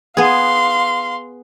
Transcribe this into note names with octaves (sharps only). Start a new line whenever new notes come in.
B3 G#4 F5 C6